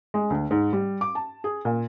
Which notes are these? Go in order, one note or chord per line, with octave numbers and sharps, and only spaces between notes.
G#3
D2
G#2
G3
D6
A5
G#4
A#2